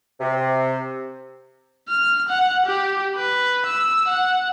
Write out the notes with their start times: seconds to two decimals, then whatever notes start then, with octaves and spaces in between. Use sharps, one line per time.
0.20 C3
1.89 F6
2.29 F#5
2.66 G4
3.16 B4
3.66 E6
4.08 F#5